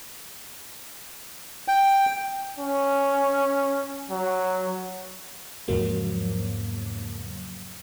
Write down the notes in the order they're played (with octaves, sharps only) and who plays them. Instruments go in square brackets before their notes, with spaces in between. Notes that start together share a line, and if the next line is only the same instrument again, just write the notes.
[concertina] G5
[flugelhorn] C#4
F#3
[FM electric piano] E2 G#2 C#3 F3 F#3 A#3